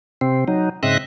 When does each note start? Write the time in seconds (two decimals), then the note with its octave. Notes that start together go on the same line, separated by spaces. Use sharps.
0.21 C3 C4
0.48 F#3 D#4
0.83 G#2 C#3 C4 D#5 E5 F#6